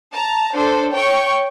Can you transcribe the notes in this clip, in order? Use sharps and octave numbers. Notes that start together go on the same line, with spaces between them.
A5 A#5
D4 A4 C5
C#5 G5 C#6